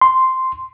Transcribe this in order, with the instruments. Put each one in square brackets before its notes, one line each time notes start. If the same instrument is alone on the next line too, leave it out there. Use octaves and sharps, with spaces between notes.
[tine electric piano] C6